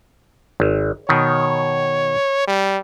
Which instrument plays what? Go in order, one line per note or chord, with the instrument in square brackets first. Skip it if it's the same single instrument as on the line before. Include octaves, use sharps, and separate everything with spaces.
[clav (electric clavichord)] G#1
[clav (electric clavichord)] B2 D#3 [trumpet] C#5
[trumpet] G3